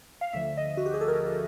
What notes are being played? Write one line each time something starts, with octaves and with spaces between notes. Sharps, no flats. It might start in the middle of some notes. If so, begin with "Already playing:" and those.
F5
D2 D3 F3 E5
D#5
F#4
G4
G#4
A4
A#4